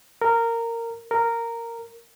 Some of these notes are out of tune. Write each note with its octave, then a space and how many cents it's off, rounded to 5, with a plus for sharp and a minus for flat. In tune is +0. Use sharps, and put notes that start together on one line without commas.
A#4 -15
A#4 -10